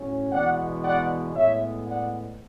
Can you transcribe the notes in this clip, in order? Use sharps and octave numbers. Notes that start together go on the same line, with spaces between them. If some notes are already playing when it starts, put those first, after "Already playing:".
Already playing: A2 F#3 C#4
E2 B2 G#3 D5 F#5
D5 F#5
A2 G#3 B3 C#5 E5
D5 F#5